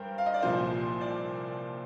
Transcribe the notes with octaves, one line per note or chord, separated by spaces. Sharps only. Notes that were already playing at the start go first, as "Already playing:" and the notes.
Already playing: G2 A#4 C5 G5
F5
D#5
D5
C2 A#2 F3 C5
D5